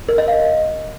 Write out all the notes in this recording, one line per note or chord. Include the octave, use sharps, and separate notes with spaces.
A#4
D#5
F5